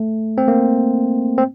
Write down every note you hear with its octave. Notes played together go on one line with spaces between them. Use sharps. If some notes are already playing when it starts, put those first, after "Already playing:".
Already playing: A3
C4
A#3
C4